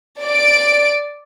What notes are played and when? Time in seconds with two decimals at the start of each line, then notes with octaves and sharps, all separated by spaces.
0.21 D5 D7